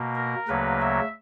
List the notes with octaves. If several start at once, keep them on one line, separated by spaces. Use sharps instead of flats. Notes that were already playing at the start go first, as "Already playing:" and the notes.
Already playing: B2 A#3
A#4
D2 C#3 F#3 A#3 B4
E5